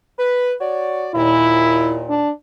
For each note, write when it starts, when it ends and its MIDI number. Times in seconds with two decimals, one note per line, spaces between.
0.18 0.53 71
0.60 1.10 66
0.60 1.10 73
0.60 1.10 74
1.15 2.23 39
1.15 2.23 46
1.15 2.01 64
2.10 2.30 62